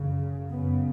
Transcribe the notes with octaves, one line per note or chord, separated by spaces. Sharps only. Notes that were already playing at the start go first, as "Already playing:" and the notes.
Already playing: F#2 C#3
F#2 C#3 B3